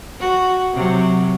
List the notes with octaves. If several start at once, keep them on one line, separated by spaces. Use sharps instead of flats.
F#4
C3 F#3